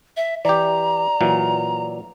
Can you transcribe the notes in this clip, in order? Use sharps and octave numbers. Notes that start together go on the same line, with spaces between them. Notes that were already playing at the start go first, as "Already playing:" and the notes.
E5
E3 G4 D5 A#5
A#2 E3 F#3